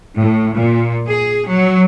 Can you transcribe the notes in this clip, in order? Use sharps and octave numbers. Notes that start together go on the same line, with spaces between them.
A2
A#2
G#4
F#3